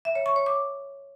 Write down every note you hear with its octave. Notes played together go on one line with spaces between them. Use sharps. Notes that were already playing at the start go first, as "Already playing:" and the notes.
E5
C#5
C#6
C#5
D6